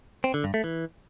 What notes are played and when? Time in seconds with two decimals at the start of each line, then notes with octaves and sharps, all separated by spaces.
0.24 C4
0.34 D3
0.44 G2
0.54 A3
0.64 E3